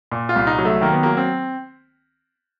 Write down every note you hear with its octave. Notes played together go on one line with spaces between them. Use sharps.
A#2
F4
C2
D#4
F#3
A3
D#3 A#3
B3
F#3 A#3
C4